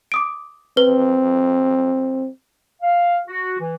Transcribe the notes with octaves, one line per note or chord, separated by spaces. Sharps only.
D6 D#6 D7
C4 B4 G7
F5
F#4
E3